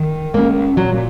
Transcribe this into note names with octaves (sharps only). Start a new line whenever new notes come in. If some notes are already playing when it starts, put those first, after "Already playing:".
Already playing: D#3
G#3 A#3 C#4
A#2 F#3